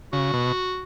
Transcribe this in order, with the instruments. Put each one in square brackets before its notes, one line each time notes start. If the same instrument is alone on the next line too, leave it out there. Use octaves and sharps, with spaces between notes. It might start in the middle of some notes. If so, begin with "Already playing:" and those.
[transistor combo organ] C#3 [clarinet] F#4
[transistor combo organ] B2